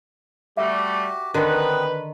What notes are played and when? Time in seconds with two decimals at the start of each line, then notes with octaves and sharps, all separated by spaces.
0.57 G3 A3 F#4 G4 E5
1.34 D3 D#3 B3 C4 D#4 B4